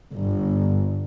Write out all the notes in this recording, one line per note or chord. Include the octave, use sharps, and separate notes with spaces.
G1